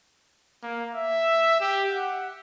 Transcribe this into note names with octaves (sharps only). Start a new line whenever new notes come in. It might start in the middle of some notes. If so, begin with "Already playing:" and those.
A#3
E5
G4
F#5